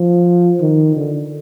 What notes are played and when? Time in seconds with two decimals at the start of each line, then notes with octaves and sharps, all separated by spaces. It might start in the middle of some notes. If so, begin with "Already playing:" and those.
Already playing: F3
0.61 D#3
0.96 D3